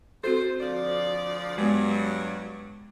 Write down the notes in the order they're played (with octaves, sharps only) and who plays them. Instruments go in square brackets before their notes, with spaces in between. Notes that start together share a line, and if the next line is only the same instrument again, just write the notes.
[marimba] C4 F#4 A4 [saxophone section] C5
[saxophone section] D2 F3 D5
[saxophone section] G2 F#3 [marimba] G#3 B3